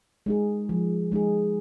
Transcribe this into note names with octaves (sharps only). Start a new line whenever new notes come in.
G#3 D#4 G#4
F3
G#3 D#4 G#4